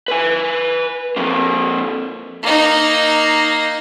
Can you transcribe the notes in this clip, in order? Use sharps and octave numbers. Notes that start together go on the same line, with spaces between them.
B4 G#5
F2 A#3
A#3 D#4